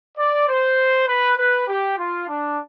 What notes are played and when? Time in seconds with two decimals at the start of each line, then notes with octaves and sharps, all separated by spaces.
0.18 D5
0.49 C5
1.08 B4
1.38 B4
1.68 G4
1.98 F4
2.28 D4